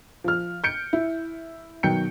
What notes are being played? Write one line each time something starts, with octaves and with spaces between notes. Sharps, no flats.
F3 F6
G6 C#7 D7
E4
B2 D#3 F#3 G5 G6 C#7